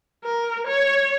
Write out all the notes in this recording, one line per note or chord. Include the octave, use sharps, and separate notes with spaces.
A#4
C#5